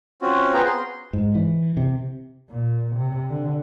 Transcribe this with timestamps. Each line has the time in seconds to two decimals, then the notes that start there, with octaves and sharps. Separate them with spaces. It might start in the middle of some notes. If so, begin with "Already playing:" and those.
0.22 C4 C#4 F4 F#4
0.54 B3 F4 G#4 B4 G5 A#5
0.65 C6
1.13 G#2
1.35 E3
1.77 C3
2.50 A#2
2.96 C3
3.30 D3